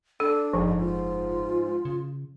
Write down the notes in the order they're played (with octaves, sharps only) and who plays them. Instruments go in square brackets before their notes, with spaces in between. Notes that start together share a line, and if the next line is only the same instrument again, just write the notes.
[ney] D4 [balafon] A4
[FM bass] F#1 [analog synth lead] G#2 [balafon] F3
[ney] F4
[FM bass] C#3